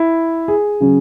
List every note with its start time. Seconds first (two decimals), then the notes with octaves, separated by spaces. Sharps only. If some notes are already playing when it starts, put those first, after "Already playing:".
Already playing: E4
0.48 G#4
0.81 C#3 F#3 C#4